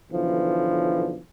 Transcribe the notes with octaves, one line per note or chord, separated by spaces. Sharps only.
B1 D3 E3 F3